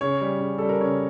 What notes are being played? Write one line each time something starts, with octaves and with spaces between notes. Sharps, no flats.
C#3 C#5
G3
C#3
G3 A4
A#4
C#3 C#5